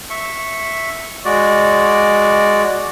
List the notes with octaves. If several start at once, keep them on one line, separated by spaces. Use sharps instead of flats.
E5 C#6
G#3 F#4 D5